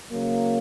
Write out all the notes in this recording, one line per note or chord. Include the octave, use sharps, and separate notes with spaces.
C#3 F#3 A#3